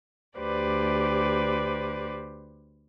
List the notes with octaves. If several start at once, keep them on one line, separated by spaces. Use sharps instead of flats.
D2 G4 B4 C5 D5